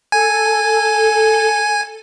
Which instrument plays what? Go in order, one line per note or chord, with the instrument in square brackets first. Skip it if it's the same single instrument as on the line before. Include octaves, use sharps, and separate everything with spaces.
[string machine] A4 [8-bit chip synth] G#5